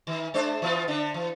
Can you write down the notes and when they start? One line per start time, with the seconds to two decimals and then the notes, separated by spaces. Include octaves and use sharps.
0.07 D#3
0.34 G#3 D4 C5
0.62 E3 B3 F4
0.88 D3 D4
1.14 E3